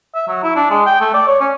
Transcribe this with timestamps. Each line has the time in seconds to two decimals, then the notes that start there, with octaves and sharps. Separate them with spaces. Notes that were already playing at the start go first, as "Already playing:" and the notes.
0.15 E5
0.28 F#3
0.43 E4
0.56 D4
0.70 G#3
0.86 G5
1.01 A3
1.14 D5
1.27 C#5
1.40 C#4